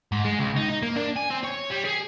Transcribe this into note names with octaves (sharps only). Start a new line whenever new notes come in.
G#2
G#3
C#2
D#4
D#4
A#3
D4
G#5
C4
C#5
G3
G#4